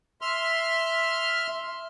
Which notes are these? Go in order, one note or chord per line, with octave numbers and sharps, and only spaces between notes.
E5 C6 F6